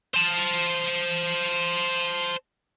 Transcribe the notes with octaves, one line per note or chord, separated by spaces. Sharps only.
C5 A5